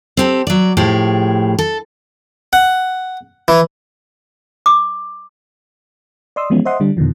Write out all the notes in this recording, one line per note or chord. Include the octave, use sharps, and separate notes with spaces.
C4 G4 A4
F#3 D5
A2 F3 G4 G#4
A4
F#5
E3
D6
D5 D#5 C6 D#6 E6
E3 F3 G#3 B3 C#4
C5 D#5 E5 F#5 C6 D#6
D3 G3 D4
F2 B2 D3 D#3 F3